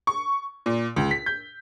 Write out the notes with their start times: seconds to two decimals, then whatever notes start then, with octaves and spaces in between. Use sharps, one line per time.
0.07 C#6
0.66 A#2
0.96 C#2
1.11 B6
1.26 G6